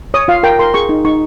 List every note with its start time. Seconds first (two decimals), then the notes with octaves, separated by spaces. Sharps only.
0.14 C#5 D#6
0.28 F4 F5
0.43 A#4 G5
0.59 A#4 C6
0.74 G#4 C#6
0.89 D#4
1.05 D#4 C#6